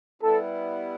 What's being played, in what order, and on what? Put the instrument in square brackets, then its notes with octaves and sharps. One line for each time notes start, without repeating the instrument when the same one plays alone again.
[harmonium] G3 B3 E4 [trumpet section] A4